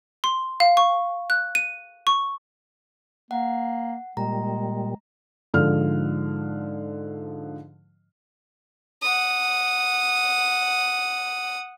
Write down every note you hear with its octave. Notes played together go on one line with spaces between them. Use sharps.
C6
F5
C#6
F#6
D#7
C#6
A#3 F#5
A#2 G3 G#3 A#5
G#2 D3 F3 F6
F#5 D#6